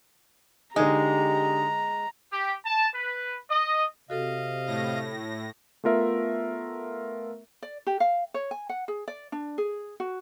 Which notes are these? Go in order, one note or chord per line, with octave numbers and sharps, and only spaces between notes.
D3 G#3 D#4 G4 A#5
G4
A5
B4
D#5
C3 F#4 A4 D#5 F5
A2 A#6
A3 B3 F4 A#4 E5
D5
G4
F5
C#5
G#5
F#5
G#4
D5
D4
G#4
F#4